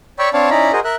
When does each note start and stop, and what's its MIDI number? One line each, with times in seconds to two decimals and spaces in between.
0.19 0.29 73
0.19 0.29 74
0.19 0.29 79
0.19 0.29 83
0.19 0.29 85
0.19 0.29 88
0.34 0.50 60
0.34 0.50 62
0.34 0.50 73
0.34 0.50 74
0.34 0.50 77
0.34 0.50 81
0.50 0.72 61
0.50 0.72 63
0.50 0.72 64
0.50 0.72 74
0.50 0.72 82
0.50 0.72 83
0.73 0.80 66
0.73 0.80 68
0.73 0.80 70
0.73 0.80 72
0.73 0.80 75
0.84 0.96 70
0.84 0.96 76
0.84 0.96 90